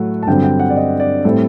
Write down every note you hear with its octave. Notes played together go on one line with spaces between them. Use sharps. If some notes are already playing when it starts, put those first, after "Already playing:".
Already playing: A2 F#3 A3 F#5
A5
G2 D3 F#3 C4 G5
G5
F#5
D5
D#5
D5
A2 G3 C4 A4